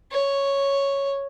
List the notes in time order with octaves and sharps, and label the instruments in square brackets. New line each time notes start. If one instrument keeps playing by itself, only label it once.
[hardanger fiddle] C#5